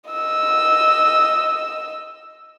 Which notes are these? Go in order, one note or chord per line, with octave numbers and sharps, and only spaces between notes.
D#5 E6